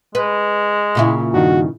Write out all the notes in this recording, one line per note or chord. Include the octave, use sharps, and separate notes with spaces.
G#3 B4
A#2 C#3 E4
G2 D#3 F#4